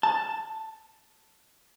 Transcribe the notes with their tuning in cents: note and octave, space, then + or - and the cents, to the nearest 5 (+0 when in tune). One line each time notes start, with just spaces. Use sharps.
A5 +5